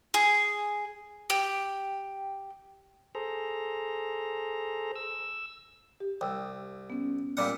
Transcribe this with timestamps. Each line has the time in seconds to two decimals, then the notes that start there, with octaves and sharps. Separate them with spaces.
0.14 G#4
1.30 G4
3.15 G#4 A4 C5 A#5
4.96 E6
6.00 G4
6.21 C2 G5 E6
6.90 B3 C#4
7.37 A#2 G3 F#5